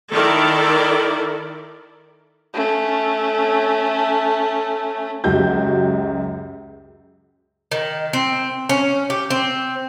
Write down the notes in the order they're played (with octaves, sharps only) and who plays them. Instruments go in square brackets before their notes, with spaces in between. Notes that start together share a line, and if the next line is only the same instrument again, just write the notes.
[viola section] D#3 E4 A4 A#4 D5
[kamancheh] A3 C#4
[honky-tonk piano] C#2 F#2 F#4 G4 G6
[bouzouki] D#3
C4
C#4
G4
C4